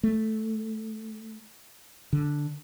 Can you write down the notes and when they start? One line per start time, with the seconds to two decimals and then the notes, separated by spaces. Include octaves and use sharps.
0.03 A3
2.13 D3